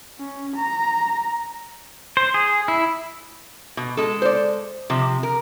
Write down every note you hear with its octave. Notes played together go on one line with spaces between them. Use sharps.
C#4
A#5
C5
G#4
E4
B2
G#3 A4
C5 D5
C3 F3
A#4